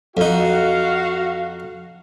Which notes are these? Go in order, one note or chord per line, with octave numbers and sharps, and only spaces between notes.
F2 D#4 F#4 F5